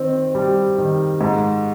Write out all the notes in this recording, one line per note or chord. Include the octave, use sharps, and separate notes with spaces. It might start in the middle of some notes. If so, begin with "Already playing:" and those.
Already playing: D#3 C4
G3
D#3
G#2